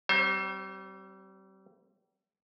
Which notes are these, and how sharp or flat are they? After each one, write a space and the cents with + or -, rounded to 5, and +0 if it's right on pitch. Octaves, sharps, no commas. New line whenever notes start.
G3 -35 C4 +0 C5 +40